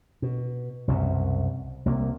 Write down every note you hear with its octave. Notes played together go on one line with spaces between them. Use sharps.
B2
C2 F#2 B2
C2 A#3